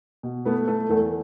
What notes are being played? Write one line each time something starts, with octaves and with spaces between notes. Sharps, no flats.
B2
A3 B3 B4
A3 A4
E2 A3 A4